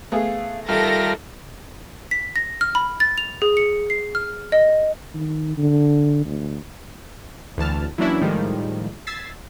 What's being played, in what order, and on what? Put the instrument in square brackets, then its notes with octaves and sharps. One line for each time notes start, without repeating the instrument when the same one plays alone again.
[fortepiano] A3 B3 G#4 [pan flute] F5
[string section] D#3 A4 A#6 [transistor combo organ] G3 F4 A#4 [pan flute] E5
[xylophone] B6
A#6
F6
B5
A6
F7
G#4
C#7
C7
F6
D#5
[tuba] D#3
D3
D2
[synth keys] D2 E3 A5 F6
E3 F#3 A#3 C#4 D4 E4
A2 D#3 F3 G3 G#3
E6 G#6 A6 B6 C7